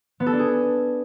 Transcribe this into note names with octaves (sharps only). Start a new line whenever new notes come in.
B3
A4
D4
G#4